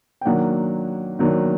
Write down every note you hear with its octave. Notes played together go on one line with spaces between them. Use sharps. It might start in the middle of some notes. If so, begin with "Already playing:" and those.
G5
D#3 F#3 A#3 D4 F#5
D#3 F#3 A#3 D4